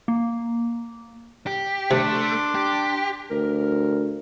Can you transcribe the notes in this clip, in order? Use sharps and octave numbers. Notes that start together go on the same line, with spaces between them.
A#3
G4
C3 A3 D4 C6 D6
G4
D2 A#4